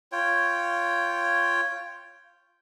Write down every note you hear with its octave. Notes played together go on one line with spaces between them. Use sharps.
F4 C#5 G5